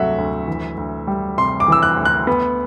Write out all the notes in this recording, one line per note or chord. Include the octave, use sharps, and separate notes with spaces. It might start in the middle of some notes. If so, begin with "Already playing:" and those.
Already playing: D2 C3 F#3 A3 E5 F#5
D2
E3
D2
G3
C3 C6
D6
E3 E6
F#6
D2
F#6
B3